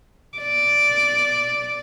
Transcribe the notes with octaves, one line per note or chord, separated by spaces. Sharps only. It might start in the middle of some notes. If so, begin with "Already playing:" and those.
D5